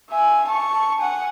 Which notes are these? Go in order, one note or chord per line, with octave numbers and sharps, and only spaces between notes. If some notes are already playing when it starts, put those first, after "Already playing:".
E5 G#5
A5 C#6
F#5 G#5